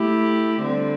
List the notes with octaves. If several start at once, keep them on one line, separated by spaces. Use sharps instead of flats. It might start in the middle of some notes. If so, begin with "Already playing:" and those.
Already playing: A3 E4 G4
D3 G3 C4